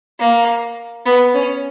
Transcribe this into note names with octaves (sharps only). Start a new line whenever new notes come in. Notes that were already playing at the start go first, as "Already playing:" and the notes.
A#3
B3
C#4